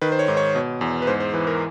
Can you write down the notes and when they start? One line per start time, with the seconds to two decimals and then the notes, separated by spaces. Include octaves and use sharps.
0.01 D#3 B4
0.12 C5
0.19 C#5
0.28 G#2
0.37 C#5
0.55 B2
0.81 E2
1.02 B4
1.07 G#2 C5
1.20 C5
1.34 E3 B4
1.47 A#4